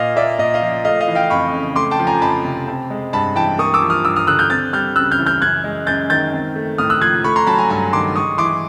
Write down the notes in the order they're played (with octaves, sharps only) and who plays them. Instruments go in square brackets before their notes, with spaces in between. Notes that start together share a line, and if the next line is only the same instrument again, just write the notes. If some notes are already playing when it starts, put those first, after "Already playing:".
Already playing: [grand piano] A#2 D#5 F5
A#3 D5 E5
A#2 D#5
D#5 F5
F3
A3 D#5 F5
D#5 F5
E3
F5 G5
F2 B5 C#6
C#3
A3 C6 D6
G5 A5
F3
G#5 A#5
F2 A5 B5
C3
C4
G#3
G2 A5 B5
E3 G5 A5
A#3 C#6 D#6
D6 E6
F3
D#6 F6
G2 D6 E6
D#6 F6
D3 E6 F#6
F6 G6
C4 G6 A6
G3 F6 G6
C#3 E6 F#6
F6 G6
E3
F6 G6
F#2 F#6 G#6
G#3
F#2 G6 A6
D#3 G6 A6
C4
A3
A2 D#6 F6
E6 F#6
F3 F#6 G#6
A3 B5 C#6
A#5 C6
F#3 A5 B5
G#5 A#5
G2 G#5 A#5
D#3 C6 D6
G#3 C#6 D#6
E3 C6 D6